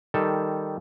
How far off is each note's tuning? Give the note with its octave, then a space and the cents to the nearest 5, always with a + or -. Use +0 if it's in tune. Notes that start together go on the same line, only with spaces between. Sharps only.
D#3 +0 G3 +0 A4 +0